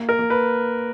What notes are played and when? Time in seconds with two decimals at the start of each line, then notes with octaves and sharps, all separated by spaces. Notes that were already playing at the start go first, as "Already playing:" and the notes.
Already playing: A#3
0.09 A#4
0.19 A#3
0.30 B4